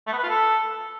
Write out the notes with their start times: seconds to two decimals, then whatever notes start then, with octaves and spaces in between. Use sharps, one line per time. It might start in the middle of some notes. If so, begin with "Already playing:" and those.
0.07 A3
0.13 B3
0.18 B4
0.23 F4
0.29 A4